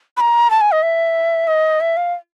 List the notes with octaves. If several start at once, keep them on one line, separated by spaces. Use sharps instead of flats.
B5
A#5
A5
G#5
D#5
E5
D#5
E5
F5